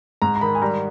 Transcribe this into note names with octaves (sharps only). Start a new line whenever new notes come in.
G#2 A#5
A#5
D#3 B5
G#5
G3 A#5